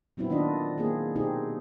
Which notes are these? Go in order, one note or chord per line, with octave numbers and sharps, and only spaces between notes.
A#2 F#3 B3 C4 E4
D#3 D4 F4 D#5
A#3 C4 G#4
B2 C4 D#4 G4 G#4